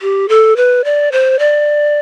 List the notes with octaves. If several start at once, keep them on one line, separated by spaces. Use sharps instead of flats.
G4
A4
B4
D5
C5
D5